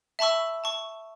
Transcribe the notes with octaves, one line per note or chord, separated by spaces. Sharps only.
E5 A5 B5 C#6 E6
A5 C#6